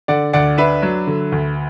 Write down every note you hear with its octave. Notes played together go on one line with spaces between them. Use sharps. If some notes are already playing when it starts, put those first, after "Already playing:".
D3 D5 F#5
D2 D5 F#5
D4 B4 E5
F#3
D3
D2